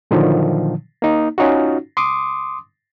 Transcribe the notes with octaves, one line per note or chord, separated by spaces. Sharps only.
A#2 D3 D#3 F3 F#3
A#3 D#4
C#4 D#4 F4 F#4
C6 D6 D#6